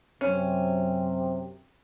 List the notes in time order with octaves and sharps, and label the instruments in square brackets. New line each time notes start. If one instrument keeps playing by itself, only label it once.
[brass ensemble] F#2 C3 [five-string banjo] C#4